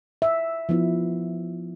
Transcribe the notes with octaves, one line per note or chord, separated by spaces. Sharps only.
E5
F3 B3 E4